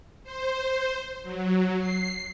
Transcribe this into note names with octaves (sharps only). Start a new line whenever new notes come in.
C5
F#3
C7